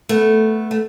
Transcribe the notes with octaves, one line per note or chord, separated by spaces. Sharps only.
A3 B3
A3